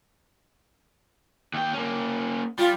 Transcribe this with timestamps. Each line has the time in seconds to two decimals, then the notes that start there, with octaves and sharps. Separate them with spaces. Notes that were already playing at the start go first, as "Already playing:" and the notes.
1.54 D#2 G5
1.73 A#3 C#4
2.59 G3 F4